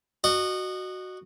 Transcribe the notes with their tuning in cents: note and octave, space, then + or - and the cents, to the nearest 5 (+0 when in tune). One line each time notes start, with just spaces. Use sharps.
F#4 +0 D#5 -30